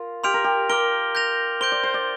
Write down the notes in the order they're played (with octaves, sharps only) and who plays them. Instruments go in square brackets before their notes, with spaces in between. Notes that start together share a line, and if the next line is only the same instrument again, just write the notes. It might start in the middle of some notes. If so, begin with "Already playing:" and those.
Already playing: [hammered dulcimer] F4 A#4
[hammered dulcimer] G4 [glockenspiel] C6 F6 D7 F7
[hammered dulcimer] A#4
G4
[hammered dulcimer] A#4 [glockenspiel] D6 F6 D7 G7
[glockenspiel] G6 A#6 F7
[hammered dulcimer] C5 [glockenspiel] G6 D7 G7
[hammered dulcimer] D5
C5
D5